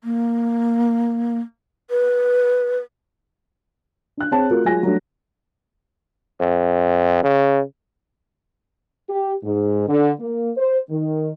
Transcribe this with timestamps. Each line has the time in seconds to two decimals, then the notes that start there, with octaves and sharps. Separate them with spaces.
0.04 A#3
1.90 B4
4.17 D4 F#6
4.32 C4 G#4 C#5 A5
4.51 A3 F4 F#4 A#4
4.65 F#3 G#3 F4 G#5 A#6
4.83 F#3 G3 A3 D4
6.40 F2
7.23 C#3
9.09 G4
9.44 G#2
9.88 D3
10.20 A#3
10.57 C5
10.89 D#3